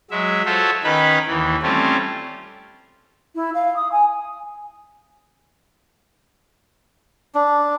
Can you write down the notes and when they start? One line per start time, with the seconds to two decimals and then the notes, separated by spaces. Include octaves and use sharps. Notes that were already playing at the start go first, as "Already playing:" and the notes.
0.11 F#3 G#3 E5
0.46 F4 F#4 A4 C5 C#5 E5
0.84 D#3 C#4 D#4 B4 B5
1.27 D#2 E3
1.63 G3 A3 C4 C#4 F4
3.35 E4
3.54 F5
3.76 D#6
3.91 G#5
7.35 D4